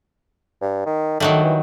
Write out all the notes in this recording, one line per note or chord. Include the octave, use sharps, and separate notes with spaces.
G2
D#3
D#3 F#3 G3 A3
E3